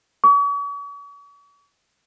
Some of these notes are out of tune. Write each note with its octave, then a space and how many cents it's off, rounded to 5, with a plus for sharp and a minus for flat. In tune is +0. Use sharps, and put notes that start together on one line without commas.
C#6 +45